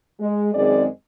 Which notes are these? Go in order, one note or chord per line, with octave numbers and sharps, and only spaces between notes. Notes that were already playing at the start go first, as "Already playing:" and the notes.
G#3
F#2 D#3 G#3 C4 G#4 D5